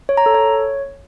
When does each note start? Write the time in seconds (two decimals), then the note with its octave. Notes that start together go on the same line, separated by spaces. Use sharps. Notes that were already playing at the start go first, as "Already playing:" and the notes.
0.09 C#5
0.17 A#5
0.26 A4
0.34 C#5